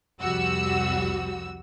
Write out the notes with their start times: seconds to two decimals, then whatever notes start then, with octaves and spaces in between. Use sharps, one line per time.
0.21 C2 F2 G3 F#4 E6